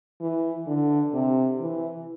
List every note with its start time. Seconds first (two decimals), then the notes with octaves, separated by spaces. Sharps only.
0.20 E3
0.67 D3
1.13 C3
1.60 E3